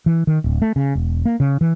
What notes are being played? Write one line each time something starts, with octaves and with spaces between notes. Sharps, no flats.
E3
D#3
D1
A3
C#3
E1
A#3
C#3
E3